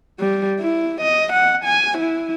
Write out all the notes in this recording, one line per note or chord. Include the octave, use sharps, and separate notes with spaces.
G3
E4
D#5
F#5
G#5
E4